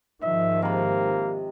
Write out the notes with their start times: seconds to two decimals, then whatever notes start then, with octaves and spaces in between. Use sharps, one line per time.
0.22 G#2 D#3 F3 D#5 E5
0.62 C3 A#3 B5